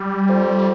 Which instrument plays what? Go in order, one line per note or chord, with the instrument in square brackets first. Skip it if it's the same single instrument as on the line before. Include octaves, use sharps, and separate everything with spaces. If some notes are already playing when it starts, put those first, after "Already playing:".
Already playing: [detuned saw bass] G3
[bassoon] F2